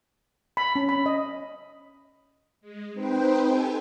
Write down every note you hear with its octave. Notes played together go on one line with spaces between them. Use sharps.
B5
C#4
B5
D#5
G#3
C4 D#4 B4 C5 G5
G4 A4 G5 G#5